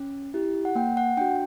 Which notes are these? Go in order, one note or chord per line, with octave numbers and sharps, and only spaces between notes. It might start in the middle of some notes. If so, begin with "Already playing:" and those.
Already playing: C#4
E4 G4
F#5
A#3 G5
F#5
D4 F#4 G5